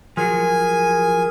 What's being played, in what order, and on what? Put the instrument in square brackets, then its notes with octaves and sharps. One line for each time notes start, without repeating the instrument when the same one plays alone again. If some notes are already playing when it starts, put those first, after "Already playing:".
[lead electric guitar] F3 F#3 [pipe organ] G#4 A#4 [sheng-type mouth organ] G#5